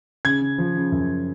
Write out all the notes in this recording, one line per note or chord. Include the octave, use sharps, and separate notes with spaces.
C#3 G#6
C#3
F3
C#3
F#2